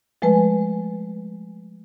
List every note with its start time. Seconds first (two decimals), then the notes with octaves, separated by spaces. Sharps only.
0.22 F3 G#3 A3 B4 G#5